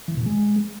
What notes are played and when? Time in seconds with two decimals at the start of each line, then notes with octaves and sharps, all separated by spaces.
0.08 E3
0.17 B2
0.26 G#3